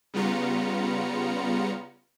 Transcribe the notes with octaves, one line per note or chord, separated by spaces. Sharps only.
C#3 G3 B3 F4 A#5 C#7